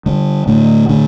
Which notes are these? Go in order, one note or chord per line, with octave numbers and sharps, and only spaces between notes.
D3 G3
A2 D3
A2 D3